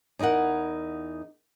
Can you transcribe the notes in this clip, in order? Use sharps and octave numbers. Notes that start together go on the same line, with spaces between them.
E2 D#4 E4 A#4 F#5